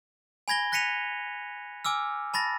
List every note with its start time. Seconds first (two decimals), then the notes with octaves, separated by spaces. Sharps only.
0.48 G#5 B5 G#6 A#6 G7
0.72 F#6 A#6 B6 C#7 D#7 F7
1.85 G#5 D6 E6 F6
2.34 A5 B5 A6 A#6